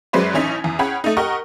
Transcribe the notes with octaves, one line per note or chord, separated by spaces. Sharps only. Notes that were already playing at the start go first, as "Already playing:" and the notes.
F#2 F#3 G#3 B4 C5 D5
A1 E3 C#4 D#4 B6
E2
C#4 G#4 F#5 G5 B5
A3 D#4
G4 A#4 D#5 F#5 C#6